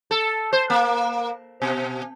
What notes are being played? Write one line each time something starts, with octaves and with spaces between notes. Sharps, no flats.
A4
C5
A#3
B2